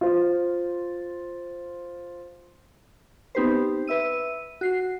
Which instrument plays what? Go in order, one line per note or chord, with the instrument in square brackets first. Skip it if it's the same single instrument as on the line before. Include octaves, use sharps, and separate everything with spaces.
[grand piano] F4 C5
[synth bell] B3 C4 D#4 G4 B4 C5
B4 E5 E6 D#7
F#4 C7